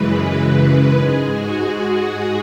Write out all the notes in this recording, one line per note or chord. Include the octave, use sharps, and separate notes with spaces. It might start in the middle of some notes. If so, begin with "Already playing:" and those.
Already playing: F#2 C#3 E3 G#3 B4
G#2 G#3 G#4
F#4
G#4